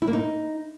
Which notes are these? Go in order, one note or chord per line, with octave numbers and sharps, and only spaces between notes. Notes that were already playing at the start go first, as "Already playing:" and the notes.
E4
A#3
D#4